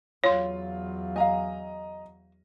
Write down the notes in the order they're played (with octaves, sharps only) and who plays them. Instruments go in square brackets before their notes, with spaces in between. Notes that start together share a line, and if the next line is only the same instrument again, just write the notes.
[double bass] E2 F#3 [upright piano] F4 [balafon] C#5 C6
[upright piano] D#5 A#5 [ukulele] F5 G#5